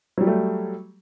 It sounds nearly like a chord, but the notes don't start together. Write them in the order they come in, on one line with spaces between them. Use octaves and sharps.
F#3 G3 G4 A3